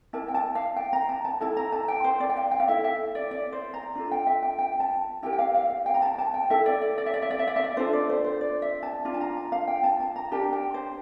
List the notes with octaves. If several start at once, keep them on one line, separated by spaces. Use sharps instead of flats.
E4 A#4 A5
G5
A5
F5
G5
A#5
A5
A5
E4 A4 A5
A#5
A5
G5
C5
D5
G5
F5
G5
F5
E4 A4 E5
E5
D5
D5
C5
A#5
D4 F4 A4
G5
E5
G5
G5
A5
E4 G4 A#4 G5
G5
F5
F5
F5
G5
A#5
A5
A5
G5
E4 A4 E5
D5
D5
D5
E5
D5
E5
D5
E5
D5
E5
D5
D4 F4 A4 C5
D5
C5
C5
D5
E5
A5
D4 F4
A5
A#5
A5
F5
G5
A5
A5
A#5
D4 G4 A#4 A5
G5
C5